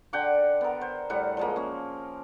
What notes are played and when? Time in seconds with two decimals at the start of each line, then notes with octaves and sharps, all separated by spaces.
0.13 D3 F#5 G5 D6
0.61 B3 A#4
0.81 C5
1.10 A2 G3 F#5
1.37 F3 G#3 A#3
1.56 A#3 C#4